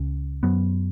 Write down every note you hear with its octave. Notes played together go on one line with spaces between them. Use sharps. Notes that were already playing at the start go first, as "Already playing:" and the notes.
Already playing: C#2 C#3
F#2 F#3 B3